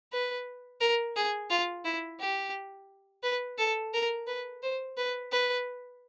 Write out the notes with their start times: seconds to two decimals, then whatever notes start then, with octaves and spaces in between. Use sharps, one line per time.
0.12 B4
0.81 A#4
1.16 G#4
1.50 F4
1.85 E4
2.20 G4
3.23 B4
3.58 A4
3.94 A#4
4.27 B4
4.62 C5
4.97 B4
5.32 B4